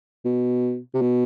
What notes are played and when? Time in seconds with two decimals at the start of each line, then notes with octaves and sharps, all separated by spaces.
0.25 B2
0.94 C3
1.01 B2